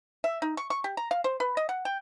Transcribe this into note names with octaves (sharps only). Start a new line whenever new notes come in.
E5
D#4
C#6
C#6
G4
A#5
F5
C5
B4
D#5
F#5
G5